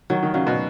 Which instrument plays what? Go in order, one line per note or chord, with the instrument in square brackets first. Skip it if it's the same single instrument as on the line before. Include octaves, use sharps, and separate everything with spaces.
[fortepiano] D#3 [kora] F#3
[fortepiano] D#3
[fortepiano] C#3 [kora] F#3
[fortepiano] B2